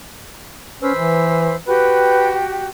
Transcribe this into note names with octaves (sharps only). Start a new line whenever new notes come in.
C#4 B4 C5 E6
E3
F#4 G4 B4 G5